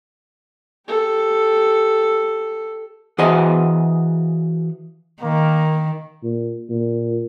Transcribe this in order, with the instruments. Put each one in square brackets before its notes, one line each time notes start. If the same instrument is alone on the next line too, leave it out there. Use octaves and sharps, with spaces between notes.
[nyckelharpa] G4 A4
[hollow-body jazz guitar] E3 F#4 G#4 C5 D#5 C6
[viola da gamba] D#3 [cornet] A#3
[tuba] A#2
A#2